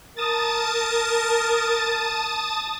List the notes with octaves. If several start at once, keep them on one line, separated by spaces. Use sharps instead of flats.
A#4 A5 D#6 A6